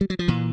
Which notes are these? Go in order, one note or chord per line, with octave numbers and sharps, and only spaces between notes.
G3
F#3
F3
A#2 E3